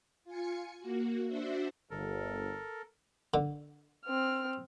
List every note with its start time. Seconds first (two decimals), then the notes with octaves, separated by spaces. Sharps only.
0.24 F4 G#5 C#7
0.79 A#3 F#4
1.27 D4 F#4 C5 E5
1.90 G1 A4 A#4
3.34 D3
4.05 C4 F6